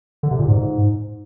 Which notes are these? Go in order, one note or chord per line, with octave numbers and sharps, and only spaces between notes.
D3
C3
A#2
G#2